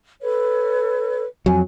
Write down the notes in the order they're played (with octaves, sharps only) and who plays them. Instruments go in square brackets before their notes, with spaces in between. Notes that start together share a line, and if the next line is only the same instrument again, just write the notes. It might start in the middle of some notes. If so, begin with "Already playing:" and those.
[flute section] A4 B4 C#5
[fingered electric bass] F2 F#3 [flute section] G#5